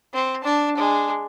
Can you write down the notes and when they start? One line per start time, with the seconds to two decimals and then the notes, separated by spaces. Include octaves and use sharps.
0.13 C4
0.43 D4 A5
0.77 G#3 D4